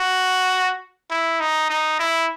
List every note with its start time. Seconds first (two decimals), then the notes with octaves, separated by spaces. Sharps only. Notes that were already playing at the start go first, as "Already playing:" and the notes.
Already playing: F#4
1.10 E4
1.40 D#4
1.70 D#4
1.99 E4